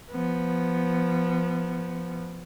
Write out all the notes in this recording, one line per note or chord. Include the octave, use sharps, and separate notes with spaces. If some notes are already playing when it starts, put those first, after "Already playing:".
F3 B3